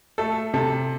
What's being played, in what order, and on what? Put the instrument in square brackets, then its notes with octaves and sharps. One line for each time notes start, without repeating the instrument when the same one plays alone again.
[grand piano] A3 [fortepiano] A4
[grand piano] C3 [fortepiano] A4